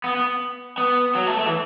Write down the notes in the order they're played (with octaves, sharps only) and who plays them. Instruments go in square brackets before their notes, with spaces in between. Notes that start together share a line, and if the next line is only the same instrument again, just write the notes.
[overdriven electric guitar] B3
B3
B3
F#3
A3
A3
E3